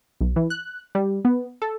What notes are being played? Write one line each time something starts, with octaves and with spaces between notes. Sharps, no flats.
B1
E3
F#6
G3
B3
A4